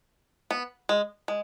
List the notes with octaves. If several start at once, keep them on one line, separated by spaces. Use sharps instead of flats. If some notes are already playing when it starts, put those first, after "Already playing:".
B3
G#3
G#3